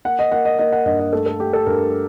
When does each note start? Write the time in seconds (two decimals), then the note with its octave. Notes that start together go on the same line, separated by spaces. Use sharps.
0.05 A#3 F#5
0.19 D#5
0.32 A#3 F#5
0.45 D#5
0.59 A#3 D#5
0.72 F#5
0.86 G2 D#5
0.99 D#5
1.13 A3 A4
1.26 A4
1.40 A3 G4
1.53 A4
1.67 G2 A#4